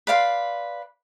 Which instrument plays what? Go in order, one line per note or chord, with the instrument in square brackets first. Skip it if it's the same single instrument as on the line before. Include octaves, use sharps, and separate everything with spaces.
[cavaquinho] B4 D5 F5 C6